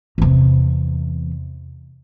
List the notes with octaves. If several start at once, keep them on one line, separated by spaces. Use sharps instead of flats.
E2 C3